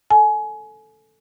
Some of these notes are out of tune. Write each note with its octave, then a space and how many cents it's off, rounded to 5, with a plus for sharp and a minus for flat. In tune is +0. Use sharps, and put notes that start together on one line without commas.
A4 +0 G#5 +25